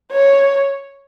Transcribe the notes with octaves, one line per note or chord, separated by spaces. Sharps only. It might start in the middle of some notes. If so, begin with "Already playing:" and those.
C#5